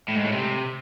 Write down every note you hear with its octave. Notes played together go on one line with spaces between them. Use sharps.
A2
G#2
A2
C3